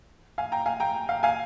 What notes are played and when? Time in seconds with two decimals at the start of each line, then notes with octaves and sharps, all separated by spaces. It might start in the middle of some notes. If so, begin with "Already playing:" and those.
0.38 F5 G#5
0.52 G5 A#5
0.66 F5 G#5
0.80 G5 A#5
1.09 F5
1.23 F5 G#5